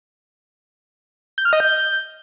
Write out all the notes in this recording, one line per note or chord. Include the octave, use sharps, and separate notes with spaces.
G6
F6
D#5
G6